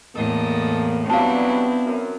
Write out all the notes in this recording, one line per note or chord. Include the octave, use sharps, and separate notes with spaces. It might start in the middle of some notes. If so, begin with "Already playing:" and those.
E2 A2 A#3 A4 A#4 D#5
F#3 G3 B3 C4 D4 E4 F5 A5
F#2